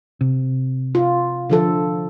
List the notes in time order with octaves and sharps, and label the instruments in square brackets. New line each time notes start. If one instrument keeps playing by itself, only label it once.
[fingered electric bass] C3
[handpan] F4
D3 F3 A4